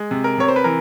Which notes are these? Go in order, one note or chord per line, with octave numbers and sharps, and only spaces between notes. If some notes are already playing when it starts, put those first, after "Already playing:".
Already playing: G#3
C3
A#4
C3 C#5
C5
B4
E3 A#4